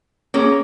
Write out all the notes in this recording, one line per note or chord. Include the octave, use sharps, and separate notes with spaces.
A#3 C#4 G#4